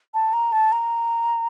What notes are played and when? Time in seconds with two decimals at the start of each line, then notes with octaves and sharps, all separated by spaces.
0.14 A5
0.33 A#5
0.52 A5
0.72 A#5